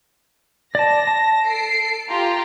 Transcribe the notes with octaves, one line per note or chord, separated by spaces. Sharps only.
D5 A5 A#6
A5
A4 C7 D7
F4 G4 A#5